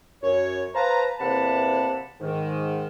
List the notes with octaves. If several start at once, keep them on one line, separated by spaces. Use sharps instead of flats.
F#2 C#5
B4 C5 F5 A5 A#5
E2 C3 A#3 F#5 A5 B5
G#2 D#3